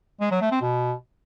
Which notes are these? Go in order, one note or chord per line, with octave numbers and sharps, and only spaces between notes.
G#3
F#3
A3
C4
B2